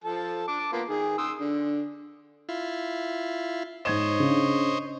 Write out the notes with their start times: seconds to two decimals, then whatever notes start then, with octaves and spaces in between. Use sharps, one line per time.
0.04 F3 A4 A5
0.48 A5 D6
0.73 A#3 B3 F4
0.88 D#3 G#4
1.18 C6 D#6 E6
1.40 D3
2.49 E4 F4
3.85 G#2 C5 C#5 D#5 G#6 E7
4.20 C#3 D4